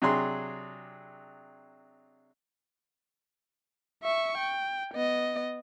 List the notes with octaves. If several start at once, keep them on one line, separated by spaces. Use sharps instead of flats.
C3 F#3 D4 G#4 C6
E5 C#6
G5
B3 D#5